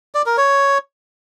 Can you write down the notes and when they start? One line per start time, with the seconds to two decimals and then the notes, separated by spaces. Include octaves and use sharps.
0.15 D5
0.26 A#4
0.38 C#5